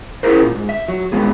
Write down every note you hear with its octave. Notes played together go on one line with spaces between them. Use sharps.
E4 G#4 A#4 C5
A#2
G#2
E5
F#3
G2 A#2 C#3 G#3 B3 G#4